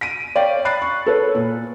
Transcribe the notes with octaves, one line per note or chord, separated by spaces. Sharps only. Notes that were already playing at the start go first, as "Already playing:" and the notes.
B6 D7 D#7
C#5 D5 F5 G5
B5 F#6 A6 C7
C#6
A4 B4 C#5
A#2